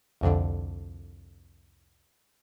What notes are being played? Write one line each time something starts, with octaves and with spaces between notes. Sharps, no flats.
C2 F2 D3